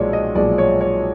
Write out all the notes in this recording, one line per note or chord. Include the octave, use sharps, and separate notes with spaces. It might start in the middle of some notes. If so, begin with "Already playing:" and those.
Already playing: B1 A#2 F3 G#3 C#5 D5
D#5
B1 A#2 F3 G#3 D5
C#5
C#5